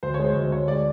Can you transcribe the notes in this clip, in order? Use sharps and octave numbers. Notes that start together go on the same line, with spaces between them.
D2 C5
C#5
G#3
C5
D2
D2 C#5
G#3 D5